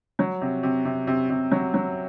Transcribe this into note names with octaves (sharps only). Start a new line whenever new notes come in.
F#3
C3
C3
C3
C3
C3
F#3
F#3